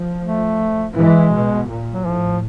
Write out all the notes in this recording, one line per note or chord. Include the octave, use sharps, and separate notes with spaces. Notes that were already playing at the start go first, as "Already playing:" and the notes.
Already playing: F3
A3
E3 G#3
B2
A#2
F#3
A2 F3